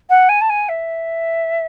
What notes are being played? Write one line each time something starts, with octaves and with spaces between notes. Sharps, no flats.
F#5
G#5
A5
G#5
E5